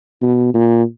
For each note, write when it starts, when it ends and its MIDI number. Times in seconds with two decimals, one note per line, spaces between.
0.22 0.53 47
0.54 0.83 46